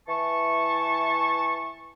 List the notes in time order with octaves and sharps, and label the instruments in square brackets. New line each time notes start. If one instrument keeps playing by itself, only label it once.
[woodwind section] E3 A5 C#6